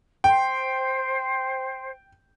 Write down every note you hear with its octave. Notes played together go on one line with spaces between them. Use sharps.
C5 G5